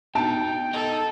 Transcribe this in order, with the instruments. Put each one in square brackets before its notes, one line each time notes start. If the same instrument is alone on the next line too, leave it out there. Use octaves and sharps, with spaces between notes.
[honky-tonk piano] B2 A5 D7 [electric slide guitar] D#4 [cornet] G5
[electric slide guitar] D#4 D#5 [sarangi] A4